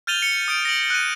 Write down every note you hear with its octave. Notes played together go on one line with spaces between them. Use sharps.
F6 G6 A6 D#7 F7 G7
C#7
D#6 G6 D7
A#6 D7 F#7
F#6 D#7